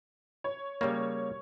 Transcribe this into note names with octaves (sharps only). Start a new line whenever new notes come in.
C#5
C#3 G3 A#3 C#5